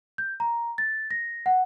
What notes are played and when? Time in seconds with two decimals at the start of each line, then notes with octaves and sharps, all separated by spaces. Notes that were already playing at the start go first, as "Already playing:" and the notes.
0.18 G6
0.40 A#5
0.78 A6
1.11 A#6
1.46 F#5